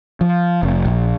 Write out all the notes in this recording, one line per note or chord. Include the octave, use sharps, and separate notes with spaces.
F3
F1
A#1